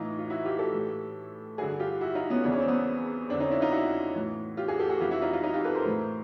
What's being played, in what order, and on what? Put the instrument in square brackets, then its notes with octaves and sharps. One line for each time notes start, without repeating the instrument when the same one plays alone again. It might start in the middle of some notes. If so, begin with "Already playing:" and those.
Already playing: [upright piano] A2 E3 D#4 F4
F4
E4 F#4
F4 G4
G4 A4
A2 E3
G2 D3 F#4 G#4
F4 G4
E4 F#4
D#4 F4
B3 C#4
E2 C#3 E3 D4
C#4
C4
B3 C#4
F2 C4 D4
D3
C#4 D#4
D4 E4
D#4 F4
E4 F#4
A2 E3
F4 G4
F#4 G#4
G4 A4
F#4 G#4
F2 C3 E3 F4 G4
E4 F#4
D#4 F4
D#4 F4
D#4 F4
F4 G4
A4 B4
A#4 C5
A2 E3